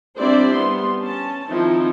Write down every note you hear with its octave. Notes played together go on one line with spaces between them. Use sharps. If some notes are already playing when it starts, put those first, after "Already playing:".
G3 C4 D4 E4 C5 D5
G3 B3 C6
C#4 A5
D#3 F3 C4 D#4 E4